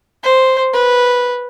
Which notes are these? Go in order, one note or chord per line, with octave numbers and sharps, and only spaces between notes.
C5
B4